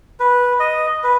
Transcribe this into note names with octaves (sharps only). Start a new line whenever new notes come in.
B4
D#5
B4